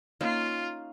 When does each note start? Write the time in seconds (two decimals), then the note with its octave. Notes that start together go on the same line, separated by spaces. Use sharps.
0.21 A#3 C#4 D#4 F4